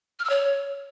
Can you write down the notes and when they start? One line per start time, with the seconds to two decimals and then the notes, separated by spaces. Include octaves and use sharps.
0.19 F6
0.25 E6
0.30 C#5